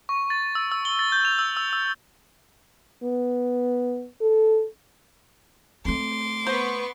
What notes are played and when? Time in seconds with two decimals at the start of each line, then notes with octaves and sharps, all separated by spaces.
0.09 C#6
0.30 A6
0.55 E6
0.72 E6
0.85 G7
0.99 A6
1.12 G6
1.25 F7
1.39 E6
1.57 E6
1.73 E6
3.03 B3
4.21 A4
5.85 A3 C4 C6 D6
6.47 B3 B4 C5 C#6